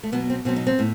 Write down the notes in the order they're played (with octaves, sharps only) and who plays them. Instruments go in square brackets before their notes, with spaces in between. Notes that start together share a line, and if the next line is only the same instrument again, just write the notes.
[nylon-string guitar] A3
B2 F#3 B3
C4
B2 F#3 C4
D#4
C4
A2